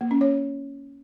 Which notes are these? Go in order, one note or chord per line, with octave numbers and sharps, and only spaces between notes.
A#3
C#4
C#5